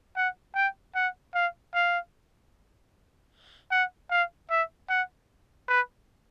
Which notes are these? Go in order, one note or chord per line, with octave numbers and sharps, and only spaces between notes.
F#5
G5
F#5
F5
F5
F#5
F5
E5
F#5
B4